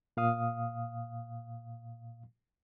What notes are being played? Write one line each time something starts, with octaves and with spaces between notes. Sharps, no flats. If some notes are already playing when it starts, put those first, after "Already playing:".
A#2 F5 D#6